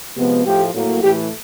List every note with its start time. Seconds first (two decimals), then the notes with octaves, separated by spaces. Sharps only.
0.16 C3 F3 G#3 B3
0.45 A2 F3 A3 G4
0.73 A2 F#3 A#3
1.03 A2 E3 A3 G4